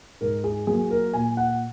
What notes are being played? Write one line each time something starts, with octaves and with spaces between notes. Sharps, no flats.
G#2 A#4
G#4
F#3 A#3 G#4
A#4
A#2 G#5
F#5